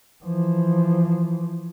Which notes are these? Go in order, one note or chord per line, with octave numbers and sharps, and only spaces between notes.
E3 F3